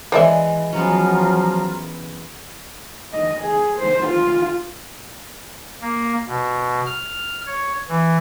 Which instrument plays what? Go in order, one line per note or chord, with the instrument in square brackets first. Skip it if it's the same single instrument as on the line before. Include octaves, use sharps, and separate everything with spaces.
[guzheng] E3 G#3 [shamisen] C5 D5 E5
[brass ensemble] F3 F#3 [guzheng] B3 C#4 [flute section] F4 A#5
[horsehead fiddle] D#5
G#4
C5
F4
[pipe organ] A#3
B2
F6
C#5
E3